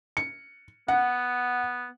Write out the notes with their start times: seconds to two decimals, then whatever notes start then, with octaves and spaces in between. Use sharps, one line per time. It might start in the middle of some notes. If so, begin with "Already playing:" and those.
0.17 C#7
0.88 B3 F#5